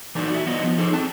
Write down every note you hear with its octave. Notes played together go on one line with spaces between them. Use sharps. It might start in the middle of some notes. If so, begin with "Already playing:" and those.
E3 F#3 A#3 D#4 A4 D5
F#4 E5
F#3 B3 F4 D#5
F3
D#4 G#4 A4 D#5
C4 A5